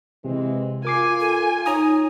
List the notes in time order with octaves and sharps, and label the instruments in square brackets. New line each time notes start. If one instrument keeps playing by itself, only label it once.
[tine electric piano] C3 [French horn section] E3 G#3 C4
[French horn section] F4 [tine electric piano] A#4 D6 C7 [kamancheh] G#5
[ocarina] A4
[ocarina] D#4 [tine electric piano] C#5 A#5 D#6